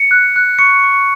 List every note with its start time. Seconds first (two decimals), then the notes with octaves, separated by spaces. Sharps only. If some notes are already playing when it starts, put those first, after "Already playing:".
Already playing: C#7
0.11 F#6
0.36 F#6
0.59 C#6 C#7
0.84 C#6